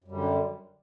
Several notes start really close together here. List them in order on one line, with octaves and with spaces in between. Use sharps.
F#2 G3 D3